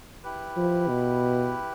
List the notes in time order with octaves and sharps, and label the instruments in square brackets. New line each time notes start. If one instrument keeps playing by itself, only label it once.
[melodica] E4 G4 B4
[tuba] F3
B2